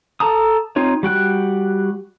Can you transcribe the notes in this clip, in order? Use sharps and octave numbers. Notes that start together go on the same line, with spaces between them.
A4 A5 A#5 D#6
C4 D#4 F4 C#5
G3 F#4 G5 F#6